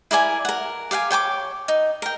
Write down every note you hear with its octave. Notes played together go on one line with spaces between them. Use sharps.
E4 A#4 D5 G#5
A#4 F#5
G4 F5 F#5 G#5
C#5 G5 A5 D6
D#4
A#4 G5